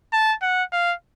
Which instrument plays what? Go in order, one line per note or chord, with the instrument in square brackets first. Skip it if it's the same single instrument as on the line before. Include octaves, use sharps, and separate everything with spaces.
[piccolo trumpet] A5
F#5
F5